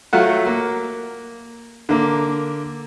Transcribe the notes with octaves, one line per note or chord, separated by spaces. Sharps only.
F#3 A3 F4 F#5
A#3
D3 A#3